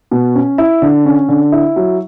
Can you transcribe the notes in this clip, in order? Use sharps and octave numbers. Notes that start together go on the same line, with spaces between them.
B2
C#4
E4
D3
C#4
D3
E4
F#3